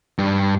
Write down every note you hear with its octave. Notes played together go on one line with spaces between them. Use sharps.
G2